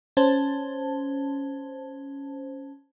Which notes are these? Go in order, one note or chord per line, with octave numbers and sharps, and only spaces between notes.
C#4 C5 A5